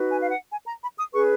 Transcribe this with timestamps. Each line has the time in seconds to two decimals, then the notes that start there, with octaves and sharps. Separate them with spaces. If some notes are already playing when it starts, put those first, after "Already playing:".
Already playing: D#4 F#4 B4
0.10 G#5
0.21 F5
0.30 F#5
0.52 G#5
0.66 A#5
0.83 B5
0.98 D#6
1.13 C#4 G#4 B4 C#6